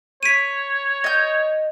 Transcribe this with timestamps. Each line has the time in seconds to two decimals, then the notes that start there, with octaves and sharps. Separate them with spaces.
0.23 C#5 B6 D7 D#7
1.04 D#5 G6